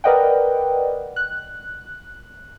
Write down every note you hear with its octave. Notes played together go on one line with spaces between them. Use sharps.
A#4 B4 D5 D#5 F#5 G5
F#6